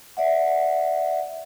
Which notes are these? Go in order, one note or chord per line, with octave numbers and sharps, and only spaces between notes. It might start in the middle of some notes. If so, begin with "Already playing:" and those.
D5 E5 F#5